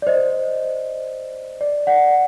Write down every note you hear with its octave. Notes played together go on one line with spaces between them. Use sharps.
D5
C5 D#5
D5
D5 F#5